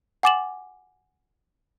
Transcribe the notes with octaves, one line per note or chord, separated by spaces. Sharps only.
F#5 G#5 D6 A6 E7 F#7